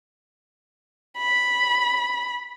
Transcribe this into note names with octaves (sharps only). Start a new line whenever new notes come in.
B5